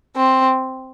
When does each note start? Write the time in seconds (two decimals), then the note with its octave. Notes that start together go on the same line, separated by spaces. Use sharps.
0.16 C4